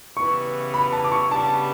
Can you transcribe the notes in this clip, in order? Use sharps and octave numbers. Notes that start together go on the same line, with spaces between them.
C#3 E3 G3 B3 C#6
B5
A5
D6
C#6
C#3 G3 B3 D4 A5